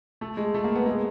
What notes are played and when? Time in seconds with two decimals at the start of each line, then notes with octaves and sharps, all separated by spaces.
0.21 A3
0.37 G#3
0.55 A3
0.64 A#3
0.75 B3
0.86 G#3